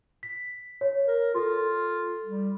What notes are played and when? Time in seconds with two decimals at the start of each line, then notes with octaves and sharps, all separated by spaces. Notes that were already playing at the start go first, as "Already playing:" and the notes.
0.23 B6
0.81 C#5
1.07 A#4
1.35 F4 A4 C6
2.24 G3